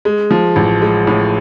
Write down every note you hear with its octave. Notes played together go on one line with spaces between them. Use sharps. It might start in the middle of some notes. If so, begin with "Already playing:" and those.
G#3
F3
A1
G#3
A2